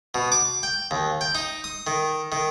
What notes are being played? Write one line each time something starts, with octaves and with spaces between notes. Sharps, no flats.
B2
D6
G5
D#2
G5
D#4
D#6
D#3
D#3